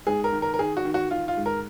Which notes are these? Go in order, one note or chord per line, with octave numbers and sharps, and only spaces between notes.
G#2 G#4
A#4
D#3
A#4
A#4
D#3 G#4
F#4
D#3
F#4
D#3 F4
F4
G#2
A#4